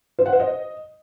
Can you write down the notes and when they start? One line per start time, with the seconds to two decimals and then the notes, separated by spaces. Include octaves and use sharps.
0.19 C5
0.26 F#5
0.33 C5
0.40 D#5